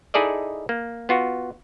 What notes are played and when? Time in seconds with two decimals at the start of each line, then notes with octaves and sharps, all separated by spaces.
0.14 D#4 E4 G#4 A4 D5 D#5
0.69 A#3
1.09 B3 F4 F#4